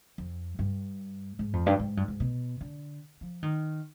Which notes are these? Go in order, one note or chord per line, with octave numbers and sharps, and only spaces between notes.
F2
G2
G#2
F2
G2
G#2
G2
G#2
B2
D3
F3
D#3